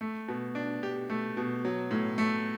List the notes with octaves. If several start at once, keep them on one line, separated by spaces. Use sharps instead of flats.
A3
B2
D4
G4
A3
B2
F#3
A2
A3